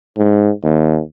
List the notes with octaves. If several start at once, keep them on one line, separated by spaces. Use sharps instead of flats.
G#2
D#2